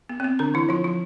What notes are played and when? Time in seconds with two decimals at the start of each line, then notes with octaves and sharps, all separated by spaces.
0.09 B3
0.20 C4
0.24 B3
0.39 D3 D4
0.54 E3 E4
0.69 F3 F4
0.84 F3 F4